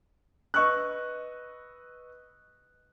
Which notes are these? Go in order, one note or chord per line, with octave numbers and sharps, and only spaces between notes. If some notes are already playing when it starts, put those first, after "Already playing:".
B4 D#5 C#6 E6 F#6